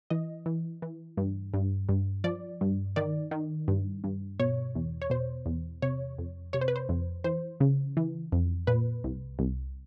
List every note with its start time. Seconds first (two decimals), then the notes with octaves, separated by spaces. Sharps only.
0.10 E3 D#5
0.46 E3
0.82 E3
1.17 G2
1.54 G2
1.89 G2
2.24 F3 D5
2.61 G2
2.96 D#3 D5
3.31 D#3
3.68 G2
4.04 G2
4.39 B2 C#5
4.75 E2
5.02 C#5
5.10 B2 C5
5.46 E2
5.82 C3 C#5
6.18 F2
6.53 C3 C#5
6.61 C5
6.68 B4
6.76 C5
6.89 F2
7.24 E3 C5
7.60 C#3
7.97 E3
8.32 F2
8.67 A#2 B4
9.04 C2
9.39 C2